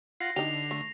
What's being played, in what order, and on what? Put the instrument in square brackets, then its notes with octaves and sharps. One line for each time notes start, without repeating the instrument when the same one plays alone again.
[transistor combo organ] F4 F#5 [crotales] A#6 C7
[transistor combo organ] D3 [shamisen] D#4 G4 [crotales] F7
[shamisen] A3